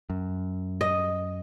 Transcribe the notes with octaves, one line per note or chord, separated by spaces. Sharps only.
F#2
D#5